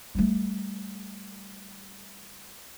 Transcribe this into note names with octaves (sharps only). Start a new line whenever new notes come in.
G3 A3